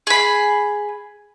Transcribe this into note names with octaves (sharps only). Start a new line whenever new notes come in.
G#4 B5